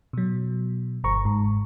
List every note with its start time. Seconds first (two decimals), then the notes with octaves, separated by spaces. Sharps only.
0.13 B2 F#3
1.04 G1 A#5 C#6
1.25 G#2